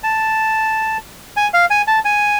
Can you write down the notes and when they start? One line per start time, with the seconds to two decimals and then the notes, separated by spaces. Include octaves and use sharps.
0.03 A5
1.37 G#5
1.54 F5
1.70 G#5
1.87 A5
2.05 G#5